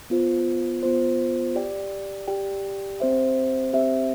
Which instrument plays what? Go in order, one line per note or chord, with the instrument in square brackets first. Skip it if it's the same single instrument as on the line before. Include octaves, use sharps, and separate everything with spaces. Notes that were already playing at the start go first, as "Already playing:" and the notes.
[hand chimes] B3 F4 C5
B3 F4 C5
G4 D5 G5
G4 D5 G5
C4 G4 C5 E5
C4 G4 C5 E5